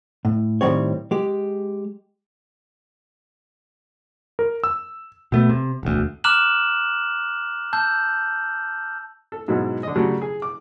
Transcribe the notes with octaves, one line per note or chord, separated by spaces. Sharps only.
A2
A2 D#3 G3 C4 C#5
G#3 G4
A#4
E6
B2 A3 B3
C3
E1 D2
A#5 D6 F6 F#6 E7 F#7
A5 E6 G6
A4
G#2 B2 F#3 G#3 E4
D3 D#5
C#3 F#3 G3 A3
G#4
D6